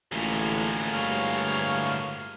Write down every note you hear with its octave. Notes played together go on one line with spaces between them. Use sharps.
A1 D2 A2 G#3 A#3 F4
G2 C#5 F5